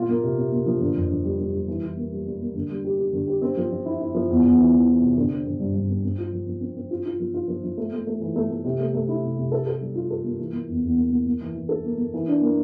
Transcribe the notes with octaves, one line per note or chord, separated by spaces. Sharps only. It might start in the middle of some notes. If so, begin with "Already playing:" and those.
Already playing: A#2 F4
A#3
C3
C3
A#3
F3
D3
F2
D3
G3
G3
G3
E3
E3
A#3
G3
G3
A#3
D3
G3
G4
G4
D3
G4
C4
F3
F3
E4
E4
F3
E2
E2
E3
E3
E3
C3
D3
C4
D3
G2
G2
C4
C4
F4
F3
F3
C4
C4
F4
F4
F3
F4
F3
F3
A3
A3
A3
E3
A3
A3
C3
A3
A3
E4
C3
C3
A4
A4
G3
F4
A4
A#3
E3
A#3
E2
E2
A#3
A#3
A#3
E3
E3
A4
A#3
A#3
E3
D4
A#3